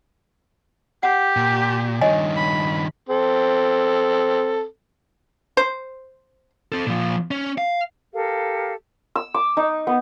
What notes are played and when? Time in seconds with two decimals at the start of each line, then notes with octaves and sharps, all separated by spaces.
1.03 G4 F#5
1.36 A#2
2.01 G2 D#3 C#5 D#5 G#5
2.36 B5
3.09 C4 A4
5.57 C5
6.72 C4 A4
6.87 A#2 F3
7.31 C#4
7.58 F5
8.13 G4 A4 A#4 F5
9.16 E6
9.34 D6
9.57 D#4
9.87 B3